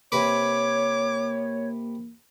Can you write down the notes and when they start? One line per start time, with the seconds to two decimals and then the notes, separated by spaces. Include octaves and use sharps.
0.12 C3 A#3 B4 C#5 D6